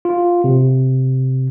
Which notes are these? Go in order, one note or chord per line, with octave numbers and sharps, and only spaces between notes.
F4
C3